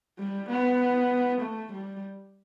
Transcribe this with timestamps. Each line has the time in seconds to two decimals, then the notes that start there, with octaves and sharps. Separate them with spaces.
0.19 G3
0.50 B3
1.42 A3
1.73 G3